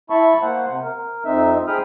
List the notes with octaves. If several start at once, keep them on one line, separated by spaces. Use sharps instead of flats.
E4 E5 A5 B5 C#6
A#3 C5 F#5
C3
A#4
F2 C4 D#4 E5
G#4 C5 G5 B5 D#6 F6